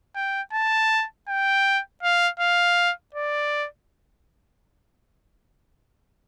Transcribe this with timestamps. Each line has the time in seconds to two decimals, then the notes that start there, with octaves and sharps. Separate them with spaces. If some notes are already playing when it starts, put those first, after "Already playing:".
0.15 G5
0.53 A5
1.28 G5
2.03 F5
2.40 F5
3.15 D5